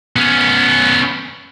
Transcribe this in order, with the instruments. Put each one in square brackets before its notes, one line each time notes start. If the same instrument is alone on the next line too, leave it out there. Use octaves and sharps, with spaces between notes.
[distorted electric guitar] B3 C#4